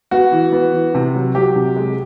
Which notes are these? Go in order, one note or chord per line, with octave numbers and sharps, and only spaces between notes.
B3 F#4
E3
B3
E3
C3
F#3
F#3 G4
C3
G#3